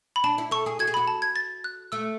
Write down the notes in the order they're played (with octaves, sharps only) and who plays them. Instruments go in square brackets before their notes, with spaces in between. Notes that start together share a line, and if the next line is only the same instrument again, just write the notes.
[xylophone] B5
[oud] D4 [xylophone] A5
[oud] E4
[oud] A4 [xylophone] C#6
[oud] G#4
[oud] F#4 [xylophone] G#6
[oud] G#4
[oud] F#4 [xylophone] B5
[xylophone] A5
G#6
A6
F#6
[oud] A3 [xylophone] E6